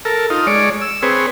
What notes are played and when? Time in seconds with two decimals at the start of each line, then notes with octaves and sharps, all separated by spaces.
0.05 A4 A#4
0.30 D#4 F4
0.47 G#3 C#5 D5
0.82 E6
1.03 C4 G#4 B4 C#5